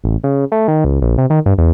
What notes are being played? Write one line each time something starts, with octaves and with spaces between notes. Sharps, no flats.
A1
C#3
A3
D#3
C#2
A#1
C3
D#3
G2
E2